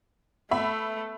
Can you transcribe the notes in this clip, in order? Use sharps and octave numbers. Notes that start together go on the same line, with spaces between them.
A3 B3 E5 B5